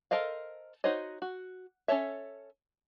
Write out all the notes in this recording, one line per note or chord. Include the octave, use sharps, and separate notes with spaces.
A4 A#4 C5 D#5 F5
D#4 F#4 C5 C#5 D#5
F#4
C#4 D4 A4 C#5 E5